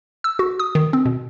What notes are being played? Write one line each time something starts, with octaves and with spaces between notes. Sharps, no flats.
E6
F#4
D#6
D#3
C4
B2